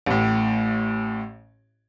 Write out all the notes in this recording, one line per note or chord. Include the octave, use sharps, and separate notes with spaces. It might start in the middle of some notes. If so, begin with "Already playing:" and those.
A1 A2